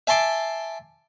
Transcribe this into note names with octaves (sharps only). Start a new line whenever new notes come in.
E5 G#5 A5 C6 D6